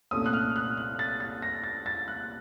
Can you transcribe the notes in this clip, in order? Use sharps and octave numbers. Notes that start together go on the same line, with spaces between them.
C2 A#2 A3 C#4 D#6
F#6
F6
F#6
F#6
A6
A6
A#6
A6
A6
F#6